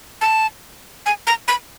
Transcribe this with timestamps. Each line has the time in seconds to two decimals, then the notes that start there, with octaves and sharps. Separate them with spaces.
0.21 A5
1.06 G#5
1.27 A#5
1.48 B5